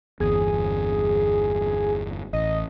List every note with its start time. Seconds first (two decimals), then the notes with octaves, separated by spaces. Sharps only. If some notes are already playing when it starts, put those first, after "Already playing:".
0.20 G1 E2 G#4
2.33 A1 D#5